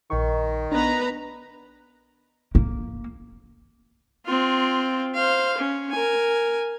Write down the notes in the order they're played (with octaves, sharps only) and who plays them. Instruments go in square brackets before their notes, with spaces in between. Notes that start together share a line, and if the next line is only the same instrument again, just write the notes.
[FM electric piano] A#1 C#6 [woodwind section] D#3
[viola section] B3 B4 A#5 [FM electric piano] D4
[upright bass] A#3
[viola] C4 F4
C5 F5
C#4
A#4 G#5